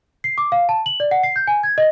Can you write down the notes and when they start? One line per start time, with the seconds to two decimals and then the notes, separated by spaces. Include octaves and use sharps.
0.24 C7
0.38 D6
0.52 F5
0.69 A5
0.86 F#7
1.00 D5
1.11 F#5
1.23 C7
1.36 G6
1.47 G#5
1.63 G#6
1.78 D#5